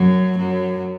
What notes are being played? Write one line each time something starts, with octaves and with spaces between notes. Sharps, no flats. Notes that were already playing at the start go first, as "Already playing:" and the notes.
Already playing: F#2 F#3
F#2 F#3